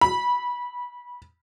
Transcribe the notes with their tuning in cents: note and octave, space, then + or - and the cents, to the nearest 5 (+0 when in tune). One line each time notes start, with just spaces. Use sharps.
B5 -20